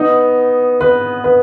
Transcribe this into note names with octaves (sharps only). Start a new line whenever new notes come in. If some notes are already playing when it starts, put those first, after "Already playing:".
Already playing: B3 D#4
B4
B4